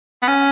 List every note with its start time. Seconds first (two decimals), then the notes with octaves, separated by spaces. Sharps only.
0.22 B3
0.28 C#4